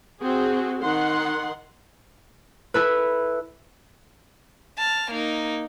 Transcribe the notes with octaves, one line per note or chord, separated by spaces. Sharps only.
C4 F#4 G#4
D#3 F#5 C6
E4 A4 B4
A5 F6
A#3 D#4